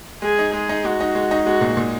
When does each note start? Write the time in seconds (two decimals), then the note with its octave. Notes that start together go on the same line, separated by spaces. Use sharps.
0.22 G#3 G#4
0.39 D#4
0.53 G#3 G#4
0.69 D#4
0.84 G#3 F#4
1.00 D#4
1.15 G#3
1.31 D#4
1.46 G#3 F#4
1.61 A#2
1.77 A#2